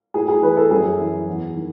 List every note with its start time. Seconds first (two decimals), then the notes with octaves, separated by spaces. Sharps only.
0.14 A2 G#4
0.28 G#4
0.42 E3 B4
0.57 A4
0.71 F#2 G#4
0.99 E3
1.28 E2
1.55 D#3